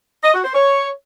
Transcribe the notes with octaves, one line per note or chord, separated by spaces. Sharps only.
D#5
F#4
C5
C#5